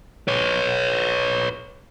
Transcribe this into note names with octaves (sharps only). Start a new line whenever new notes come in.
B4 C#5